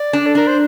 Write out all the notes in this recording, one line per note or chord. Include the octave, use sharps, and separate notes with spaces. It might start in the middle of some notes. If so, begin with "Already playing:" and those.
Already playing: D5
D4
A4
D4 A#4
C5